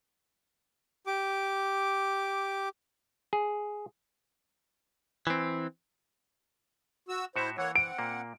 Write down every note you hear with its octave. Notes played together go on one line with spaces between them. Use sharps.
G4 D6
G#4
E3 C4
F#4 E6
A2 E4 F#4 C5 E5
E3 A#3 C#5 F#5
C4 F#5 D7
A#2 A#3